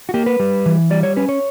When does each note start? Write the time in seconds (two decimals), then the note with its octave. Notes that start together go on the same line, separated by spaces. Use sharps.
0.09 F#4
0.14 A#3 G4
0.26 B4
0.40 G3
0.66 E3
0.90 G3 D5
1.03 C#5
1.16 C#4 B4
1.29 C#5